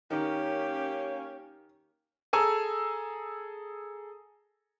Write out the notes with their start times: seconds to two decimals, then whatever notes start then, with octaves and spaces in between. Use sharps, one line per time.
0.10 D#3 A#3 C#4 G4
2.33 G#4 A4 G#5 A#5 E6